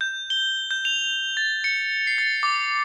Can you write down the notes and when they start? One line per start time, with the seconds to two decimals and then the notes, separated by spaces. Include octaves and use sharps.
0.01 G6
0.30 G7
0.71 G6
0.85 F7
1.37 A6
1.64 C#7
2.07 C7
2.18 A6
2.43 D6